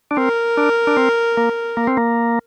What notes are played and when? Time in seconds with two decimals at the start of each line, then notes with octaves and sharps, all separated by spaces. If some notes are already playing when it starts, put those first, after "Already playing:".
0.11 D4
0.17 C4 A#4
0.57 D4
0.87 D4
0.97 C4
1.37 A#3
1.77 A#3
1.87 C4
1.97 A#3